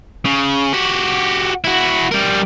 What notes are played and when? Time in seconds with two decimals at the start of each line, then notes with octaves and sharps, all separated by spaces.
0.25 C#3
0.73 F#4 G4
1.64 E4 F#4
2.12 G3 A#4